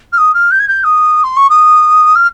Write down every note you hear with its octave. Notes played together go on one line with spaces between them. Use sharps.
F6
D#6
F6
G6
G#6
G6
D#6
C6
C#6
D#6
F6